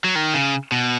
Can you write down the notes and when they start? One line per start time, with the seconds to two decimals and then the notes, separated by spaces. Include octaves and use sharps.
0.04 F#3
0.15 D#3
0.34 C#3
0.72 B2